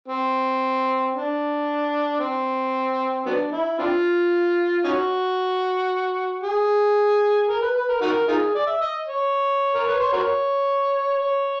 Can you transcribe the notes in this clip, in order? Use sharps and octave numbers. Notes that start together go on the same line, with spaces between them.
C4
D4
C4
F#3 B3 D4
E4
C4 D4 F4
C#4 D#4 F#4
G#4
A#4
B4
B4
A#4
D#4 F#4 A#4
D#4 F4 G#4
D5
E5
D#5
C#5
A#4
B4
C5
F#4 A#4 C#5
C#5